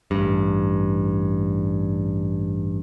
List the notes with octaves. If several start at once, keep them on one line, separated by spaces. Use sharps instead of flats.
A1 G2